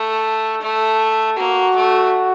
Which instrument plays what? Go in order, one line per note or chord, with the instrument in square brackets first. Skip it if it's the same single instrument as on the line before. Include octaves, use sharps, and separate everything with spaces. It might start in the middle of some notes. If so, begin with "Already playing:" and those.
Already playing: [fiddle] A3
A3
[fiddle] A#3 [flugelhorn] F#4
[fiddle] A3